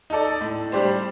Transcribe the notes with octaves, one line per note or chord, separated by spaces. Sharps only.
D#4 A4 D5
A2
G3 D4 G4 C5